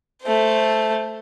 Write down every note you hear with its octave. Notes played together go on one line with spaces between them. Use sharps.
A3 C5